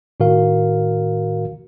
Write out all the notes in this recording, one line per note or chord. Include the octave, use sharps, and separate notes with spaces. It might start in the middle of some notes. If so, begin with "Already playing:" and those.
A2 D#3 F#4 A#4 F5